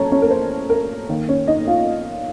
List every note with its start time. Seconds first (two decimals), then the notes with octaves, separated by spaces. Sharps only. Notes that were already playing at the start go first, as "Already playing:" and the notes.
Already playing: A2 F#3 A#3 C#4 A4 C#5 A5 A#5
0.12 C#4 C#5
0.22 A#4
0.31 C5
0.70 A#4
1.08 D#3 A#3
1.29 C#4 C#5
1.47 D#4 D#5
1.67 F4 F5